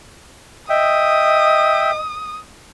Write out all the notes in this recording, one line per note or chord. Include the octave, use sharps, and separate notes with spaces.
D#5 E5 G5 D#6